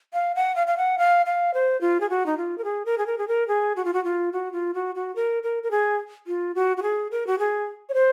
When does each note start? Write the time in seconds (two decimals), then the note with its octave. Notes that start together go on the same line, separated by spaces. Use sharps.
0.13 F5
0.35 F#5
0.56 F5
0.67 F5
0.77 F#5
0.98 F5
1.26 F5
1.54 C5
1.81 F4
2.01 G#4
2.10 F#4
2.26 D#4
2.38 F4
2.58 A#4
2.64 G#4
2.86 A#4
2.98 G#4
3.07 A#4
3.18 G#4
3.28 A#4
3.48 G#4
3.76 F#4
3.85 F4
3.93 F#4
4.05 F4
4.33 F#4
4.52 F4
4.74 F#4
4.95 F#4
5.16 A#4
5.43 A#4
5.63 A#4
5.71 G#4
6.27 F4
6.55 F#4
6.77 F#4
6.82 G#4
7.11 A#4
7.27 F#4
7.39 G#4
7.89 C#5
7.94 C5